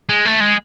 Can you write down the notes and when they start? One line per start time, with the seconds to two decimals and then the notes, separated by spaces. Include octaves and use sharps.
0.09 G#3
0.25 A3
0.40 G#3